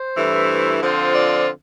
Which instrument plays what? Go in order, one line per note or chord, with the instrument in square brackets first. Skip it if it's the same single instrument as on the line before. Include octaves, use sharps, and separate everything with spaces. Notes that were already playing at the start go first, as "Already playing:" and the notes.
Already playing: [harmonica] C5
[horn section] G2 E3 A3 E4
[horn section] D3 F3 C4 F4 [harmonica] C5
[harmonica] D5